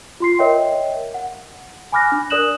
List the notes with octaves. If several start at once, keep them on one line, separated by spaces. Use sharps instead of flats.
F4 C6 C7
A#4 C#5 D#5 E5 G5
F#5
G#5 B5 D6 F6 F#6 A#6
D4
A#4 D5 D#6 F#6 E7 F#7